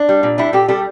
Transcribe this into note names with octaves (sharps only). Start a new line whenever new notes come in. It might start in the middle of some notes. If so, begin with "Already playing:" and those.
Already playing: D4
G3
A#2
G3 D4 E4
A#2 G4 A4
G3 G4 A4